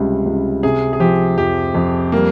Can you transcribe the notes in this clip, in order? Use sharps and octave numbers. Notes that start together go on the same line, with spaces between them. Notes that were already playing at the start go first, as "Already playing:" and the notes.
Already playing: C#2 C3 G3
C#2
C3 G#4
G#4
F3 G4
F2 G4
F2
G3 A#3